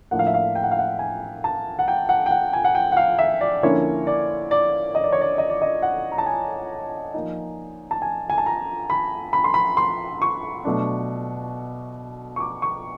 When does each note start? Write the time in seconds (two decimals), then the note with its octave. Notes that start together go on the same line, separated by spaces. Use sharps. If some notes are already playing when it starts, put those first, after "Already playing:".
0.11 A2 F3 A#3 D4 F#5
0.19 F5
0.27 E5
0.34 F5
0.55 G5
0.63 F#5
0.71 F5
0.78 F#5
0.99 G#5
1.44 A5
1.79 F#5
1.88 G5
2.09 F#5
2.26 G5
2.31 F#5
2.53 G#5
2.64 F#5
2.75 G5
2.92 F#5
2.97 F5
3.19 E5
3.41 D5
3.63 D3 F3 A#3 C#4 E4 C#5
4.07 D5
4.51 D5
4.95 D#5
5.04 D5
5.13 C#5
5.21 D5
5.38 D#5
5.50 D5
5.62 D#5
5.82 F#5
6.12 A#5
6.18 A5
6.26 G#5
7.14 F3 A#3 D#4
7.91 A5
8.02 G#5
8.30 G#5
8.38 A5
8.46 A#5
8.90 B5
9.33 B5
9.44 C6
9.54 B5
9.77 C6
10.22 C#6
10.65 B2 F#3 A3 D4
12.36 C#6
12.40 D6
12.62 C#6